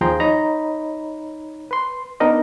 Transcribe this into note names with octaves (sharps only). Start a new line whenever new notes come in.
D#2 F3 G#4 G5 A#5 C6
D#4 C#5 D#5 A#5 B5
B4 C6
B3 D4 D#4 A#4 D#5